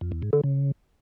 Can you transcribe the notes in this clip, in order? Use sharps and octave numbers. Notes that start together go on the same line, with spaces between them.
F2
E2
G#2
D3
C#3